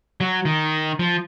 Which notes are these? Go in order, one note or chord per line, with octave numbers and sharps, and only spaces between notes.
F#3
D#3
F3